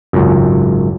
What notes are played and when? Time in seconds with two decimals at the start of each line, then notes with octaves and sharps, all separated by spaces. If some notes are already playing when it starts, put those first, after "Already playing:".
0.13 G#1 C#2 F#2